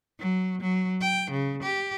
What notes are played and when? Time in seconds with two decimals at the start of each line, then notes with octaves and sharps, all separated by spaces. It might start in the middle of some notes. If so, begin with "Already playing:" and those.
0.20 F#3
0.61 F#3
1.01 G5
1.31 C#3
1.63 G4